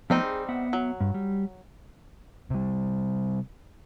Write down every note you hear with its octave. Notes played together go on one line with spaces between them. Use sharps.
F3 G3 A3 B3 C4 D#4
G#4
B3 E5 F#5
F#3
G2
G3
C3 G3